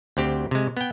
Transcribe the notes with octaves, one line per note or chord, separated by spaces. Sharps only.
D2 C4 G4
C3 G#3
B3 G5